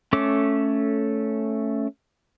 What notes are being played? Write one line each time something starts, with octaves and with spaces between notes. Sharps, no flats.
A3 C#4 A4 D6